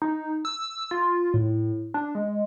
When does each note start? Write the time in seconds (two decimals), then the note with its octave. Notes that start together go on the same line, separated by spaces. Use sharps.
0.02 D#4
0.45 E6
0.91 F4
1.34 A2
1.94 D4
2.15 G#3